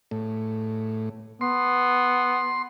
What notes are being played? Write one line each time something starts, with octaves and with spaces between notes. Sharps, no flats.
A2
B3 C6